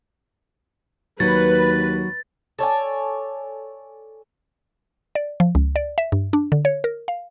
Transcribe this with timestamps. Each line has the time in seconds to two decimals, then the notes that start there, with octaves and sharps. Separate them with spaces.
1.20 D#2 F#3 B4 A6
2.59 A4 C#5 D5 G#5
5.15 D5
5.40 F3
5.55 C#2
5.76 D5
5.98 E5
6.12 G2
6.33 D4
6.52 D3
6.65 C#5
6.84 A#4
7.08 F5